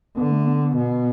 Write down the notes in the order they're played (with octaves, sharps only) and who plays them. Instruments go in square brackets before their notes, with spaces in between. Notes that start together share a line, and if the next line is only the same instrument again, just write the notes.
[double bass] D3 [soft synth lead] B3
[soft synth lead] A3
B3
[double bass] B2